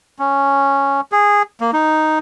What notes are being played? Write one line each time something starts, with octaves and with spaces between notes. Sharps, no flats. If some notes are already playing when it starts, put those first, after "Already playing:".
C#4
G#4
A#3
D#4